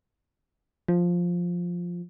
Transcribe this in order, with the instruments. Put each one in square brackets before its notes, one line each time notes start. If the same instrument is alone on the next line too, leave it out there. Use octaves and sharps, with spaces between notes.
[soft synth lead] F3